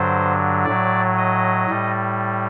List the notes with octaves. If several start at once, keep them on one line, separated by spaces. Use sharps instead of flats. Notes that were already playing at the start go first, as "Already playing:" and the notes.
Already playing: G2 D3 F#3 C5
A2 F#3 D5
D#5
A2 G3